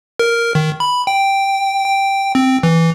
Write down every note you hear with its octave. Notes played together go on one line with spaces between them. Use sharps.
A#4
D#3
B5
G5
G5
C4
E3